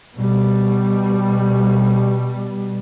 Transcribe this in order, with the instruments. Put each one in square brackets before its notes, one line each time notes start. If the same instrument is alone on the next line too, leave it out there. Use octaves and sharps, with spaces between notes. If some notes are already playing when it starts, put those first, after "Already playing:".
[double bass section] B2 G3